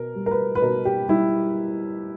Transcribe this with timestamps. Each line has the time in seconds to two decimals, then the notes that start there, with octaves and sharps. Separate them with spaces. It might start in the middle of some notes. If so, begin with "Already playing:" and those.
Already playing: B2 A#4
0.15 G3
0.26 A#4
0.31 B4
0.55 B4
0.62 B2 A#4
0.85 G4
1.08 G3 E4